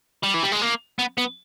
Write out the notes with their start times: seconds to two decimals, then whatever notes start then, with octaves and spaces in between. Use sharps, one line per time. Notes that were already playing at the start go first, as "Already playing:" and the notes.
0.23 G3
0.34 E3
0.43 G3
0.52 G#3
0.62 A#3
0.99 B3
1.18 B3